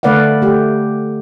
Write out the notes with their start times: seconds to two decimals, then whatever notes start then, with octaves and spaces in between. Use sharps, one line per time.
0.03 D3 A3 B4 D5 F5 F#5
0.42 A3 G4